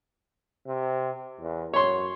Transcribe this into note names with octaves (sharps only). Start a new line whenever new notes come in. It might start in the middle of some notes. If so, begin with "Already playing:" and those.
C3
E2
F#2 C#5 C6